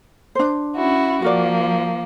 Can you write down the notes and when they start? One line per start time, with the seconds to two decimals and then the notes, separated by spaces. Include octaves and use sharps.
0.35 D4 C5
0.76 C#4 E4 F#4
1.22 F3 A#3 F#4 A#4 D5